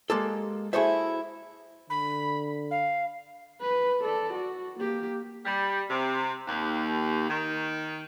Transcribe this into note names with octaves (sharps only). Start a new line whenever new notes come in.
G#3 A#3 G4 A4
E4 F#4 G#4 A4 C5 E5
D3 B5
F5
B4
A4 D5
F#4
A#3 G4
G3
C3
D#2
D#3